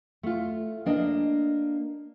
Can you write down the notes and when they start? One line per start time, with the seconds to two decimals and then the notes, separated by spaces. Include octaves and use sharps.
0.23 A3 F4
0.86 A#3 D4 D#5